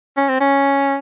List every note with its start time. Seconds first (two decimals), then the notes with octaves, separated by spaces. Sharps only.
0.17 C#4
0.28 C4
0.40 C#4